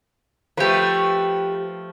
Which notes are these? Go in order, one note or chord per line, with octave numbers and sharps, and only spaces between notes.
F3 A3 G4 B4